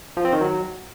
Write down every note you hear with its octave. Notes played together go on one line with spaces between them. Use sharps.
F3
C4
D#3
F#3